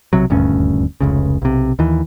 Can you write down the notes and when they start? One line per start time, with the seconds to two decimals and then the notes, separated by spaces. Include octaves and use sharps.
0.13 B1 C3 F#3
0.30 D#1 D2 G2 C#4
1.01 F1 C#2 C#3
1.42 B1 C3
1.79 D#2 E3